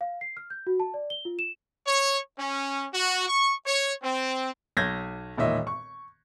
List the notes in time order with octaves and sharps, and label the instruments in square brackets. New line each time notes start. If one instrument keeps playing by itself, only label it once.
[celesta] F5
C7
F6
G6
F#4
A5
D5
G7
F4
E7
[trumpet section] C#5
C#4
F#4
C#6
C#5
C4
[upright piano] B1 G6 G#6 A#6
E1 A#2 D#3 C#5 D#5 E5
C#6